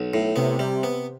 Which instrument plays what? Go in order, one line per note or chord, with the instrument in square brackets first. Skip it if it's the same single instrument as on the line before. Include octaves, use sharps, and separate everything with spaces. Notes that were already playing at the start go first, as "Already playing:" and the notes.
Already playing: [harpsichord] B1
A2
[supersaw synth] C3 [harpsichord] B3
[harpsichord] G3
B3